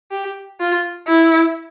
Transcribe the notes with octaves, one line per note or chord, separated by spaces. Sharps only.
G4
F4
E4